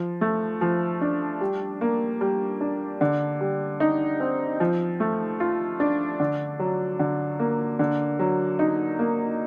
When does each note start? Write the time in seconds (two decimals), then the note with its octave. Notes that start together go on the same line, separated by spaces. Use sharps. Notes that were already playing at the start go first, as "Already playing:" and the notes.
Already playing: F3
0.21 A3
0.61 F3
1.01 D4
1.41 G3
1.81 A#3
2.21 G3
2.61 D4
3.01 D3
3.41 G3
3.80 D#4
4.20 C4
4.60 F3
5.00 A3
5.40 F4
5.80 D4
6.20 D3
6.59 F#3
6.99 D3
7.39 A#3
7.79 D3
8.19 F#3
8.59 D#4
8.99 A#3